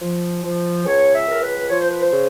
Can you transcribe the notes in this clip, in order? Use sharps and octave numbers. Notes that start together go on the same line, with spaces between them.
F3
F3
C#2 C#5
E5
C#2 A#4
B4
F3 C#5
C5
B4
C5
C#3